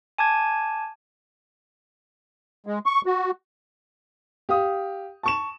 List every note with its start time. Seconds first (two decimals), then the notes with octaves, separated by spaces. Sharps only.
0.18 G#5 A5 D6 G#6
2.66 G#3
2.86 C#6
3.06 F#4
4.49 G4 F5 D#6
5.23 A5 C#6 E7